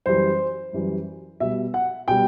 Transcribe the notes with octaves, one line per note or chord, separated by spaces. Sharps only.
F#2 E3 G3 C5
F#2 E3 G3
B2 G3 E5
F#5
B2 G3 G5